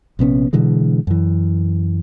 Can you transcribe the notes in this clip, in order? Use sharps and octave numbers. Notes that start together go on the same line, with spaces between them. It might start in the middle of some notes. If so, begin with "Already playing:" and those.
A#1 C3 B3 C#4
B2 D3 E3 G#3
F#2 E3